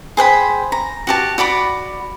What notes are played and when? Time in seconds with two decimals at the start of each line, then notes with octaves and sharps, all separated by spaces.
0.17 G#4 C5 G5 B5
0.72 A#5
1.07 F#4 G4 A5
1.38 F#4 D5 B5 D6